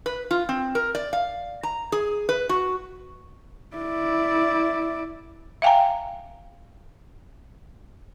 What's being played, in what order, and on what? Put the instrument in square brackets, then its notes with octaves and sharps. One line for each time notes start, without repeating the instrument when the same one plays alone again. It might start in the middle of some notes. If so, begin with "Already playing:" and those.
[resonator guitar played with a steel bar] B4
F4
C4
A#4
D5
F5
A#5
G#4
B4
F#4
[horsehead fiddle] E4 D5
[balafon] E5 F5 G5 G#5 A#5